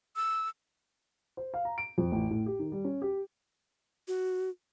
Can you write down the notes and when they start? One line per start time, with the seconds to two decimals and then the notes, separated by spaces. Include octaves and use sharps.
0.16 E6
1.37 C5
1.54 F5
1.65 A#5
1.78 D7
1.98 F2
2.12 A1
2.31 A2
2.46 G4
2.59 D#3
2.72 G3
2.85 C#4
3.02 G4
4.08 F#4